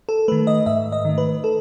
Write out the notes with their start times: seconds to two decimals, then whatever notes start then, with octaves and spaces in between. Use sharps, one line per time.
0.09 A4
0.28 D#3 A3 B4
0.47 D#5
0.66 G#2 E5
0.92 D#5
1.05 D#3 A3
1.18 B4
1.44 A4